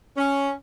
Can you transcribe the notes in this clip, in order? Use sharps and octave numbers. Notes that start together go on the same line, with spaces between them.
C#4